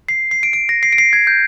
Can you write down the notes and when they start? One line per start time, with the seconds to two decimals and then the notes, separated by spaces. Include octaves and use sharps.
0.09 C7
0.31 C7
0.43 D7
0.53 D7
0.69 A#6
0.83 C7
0.93 D7
0.98 C7
1.13 G#6
1.27 G6